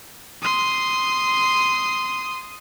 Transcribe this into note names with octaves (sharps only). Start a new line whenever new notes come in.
C6 D#6